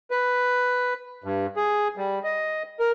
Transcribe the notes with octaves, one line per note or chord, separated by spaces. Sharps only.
B4
G2
G#4
G3
D#5
A#4